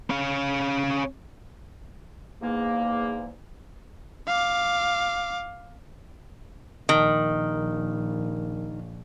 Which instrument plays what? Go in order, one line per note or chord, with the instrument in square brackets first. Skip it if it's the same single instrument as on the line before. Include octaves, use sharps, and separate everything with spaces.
[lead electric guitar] C#4 F5
[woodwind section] E2 G#2 A#3
[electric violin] F5 D6
[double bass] A#1 [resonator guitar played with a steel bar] D#3